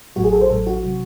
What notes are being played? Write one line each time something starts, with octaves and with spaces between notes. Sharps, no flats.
A1 A2 F#3 F#4
G#4
A4
C5
A1 A2 F#3 A4
F#4
C3 F#3